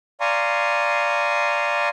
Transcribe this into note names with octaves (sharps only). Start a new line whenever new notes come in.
D5 F5 G#5 A#5 C6 C#6